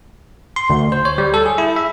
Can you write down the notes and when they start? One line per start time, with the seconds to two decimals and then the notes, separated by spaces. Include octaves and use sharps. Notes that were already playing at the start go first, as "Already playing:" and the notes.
0.56 C6
0.70 D2
0.92 C5
1.05 C#5
1.18 G3
1.34 A4
1.46 G#4
1.58 E4
1.76 E5